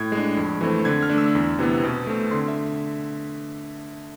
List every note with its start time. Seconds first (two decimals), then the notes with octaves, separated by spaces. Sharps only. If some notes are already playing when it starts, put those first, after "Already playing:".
Already playing: A2 G#6
0.12 G#3
0.17 D4
0.37 F2
0.61 E3 A3 C4
0.85 D3 G#6
1.02 F6
1.10 A3 D4
1.18 E6
1.35 E2
1.59 C3 E3 B3
1.83 B2
2.07 A3 C4
2.31 D3 C6
2.48 E5